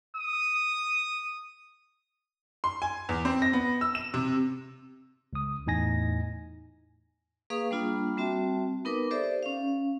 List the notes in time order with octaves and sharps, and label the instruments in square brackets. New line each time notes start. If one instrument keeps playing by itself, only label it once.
[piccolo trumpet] D#6
[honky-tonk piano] C6
G#5
E2
C4
A#6
B3
E6
E7
C3
[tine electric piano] C#2 D#6
E2 A2 D#4 G#5 A#6
[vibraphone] A#3 G#4 B4 F5 C#6 D#6
G3 A#3 D4 F4 B5
G3 C4 F#4 E5 A5
B3 D#4 A#4 B4 D6
G4 A4 C5 D5 E5
C#4 F5